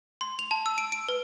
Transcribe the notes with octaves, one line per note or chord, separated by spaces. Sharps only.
C6
F7
A5
E6
D7
D7
B4